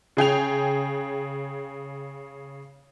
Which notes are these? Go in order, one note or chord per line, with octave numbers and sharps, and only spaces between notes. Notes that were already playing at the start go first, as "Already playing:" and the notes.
C#3 G#4 G5 F7